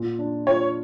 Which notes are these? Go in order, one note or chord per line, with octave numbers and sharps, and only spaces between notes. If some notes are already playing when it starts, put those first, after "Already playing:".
Already playing: A#2 F4
D4
F4 C#5